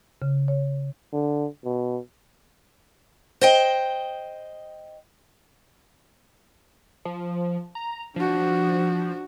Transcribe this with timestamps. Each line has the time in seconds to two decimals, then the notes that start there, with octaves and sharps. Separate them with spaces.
0.22 C#3
0.48 C#5
1.13 D3
1.64 B2
3.41 C5 D#5 G5
7.05 F3
7.75 A#5
8.16 F3 D4 F#4